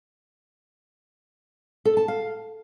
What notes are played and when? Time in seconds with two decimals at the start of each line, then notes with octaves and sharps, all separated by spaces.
1.85 A4
1.97 A5
2.08 F5